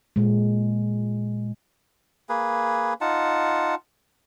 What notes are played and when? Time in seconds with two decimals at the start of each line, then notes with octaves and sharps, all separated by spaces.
0.16 A#2 G#3
2.29 A#3 G#4 B4
3.01 D#4 F4 F#5 A5